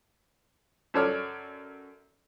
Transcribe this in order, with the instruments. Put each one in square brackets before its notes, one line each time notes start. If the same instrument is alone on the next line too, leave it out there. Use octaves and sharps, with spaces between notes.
[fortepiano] F#2 A4 C#5 D5 F6